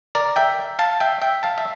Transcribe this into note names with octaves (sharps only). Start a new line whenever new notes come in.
A#4 D5
E5 G5
F5 A5
E5 G5
E5 G5
F5 A5
E5